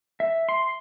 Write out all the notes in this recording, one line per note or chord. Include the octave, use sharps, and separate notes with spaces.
E5
C6